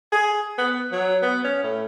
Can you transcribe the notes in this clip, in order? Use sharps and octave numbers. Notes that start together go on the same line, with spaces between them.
G#4
B3
F#3
B3
C#4
A2